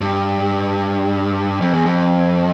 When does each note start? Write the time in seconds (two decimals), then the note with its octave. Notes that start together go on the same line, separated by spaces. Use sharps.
0.01 G2
1.61 F2
1.73 E2
1.86 F2